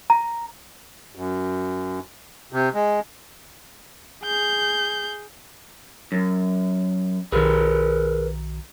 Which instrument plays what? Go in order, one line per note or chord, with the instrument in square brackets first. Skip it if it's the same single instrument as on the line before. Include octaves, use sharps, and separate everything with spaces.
[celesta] A#5
[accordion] F#2
C3
G#3
[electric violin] G#4 G6
[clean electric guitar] F#2
[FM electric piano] B1 D#3 [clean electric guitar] G#4 A#4 B4